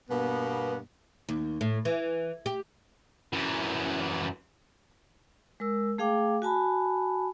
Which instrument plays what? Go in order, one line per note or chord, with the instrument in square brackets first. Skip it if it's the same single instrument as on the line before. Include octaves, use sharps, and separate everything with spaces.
[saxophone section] G2 B2 A#3 B3
[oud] D#2
A2
E3
G4
[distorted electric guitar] F#2 E3
[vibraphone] G#3 A#4 E6
A3 G#4 F5 G5 D6
F#4 G#5 A5 B5